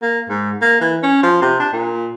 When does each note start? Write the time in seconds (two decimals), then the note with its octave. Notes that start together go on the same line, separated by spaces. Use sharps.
0.03 A#3
0.29 G#2
0.62 A#3
0.81 E3
1.03 C#4
1.23 F3
1.42 C3
1.60 D4
1.73 A#2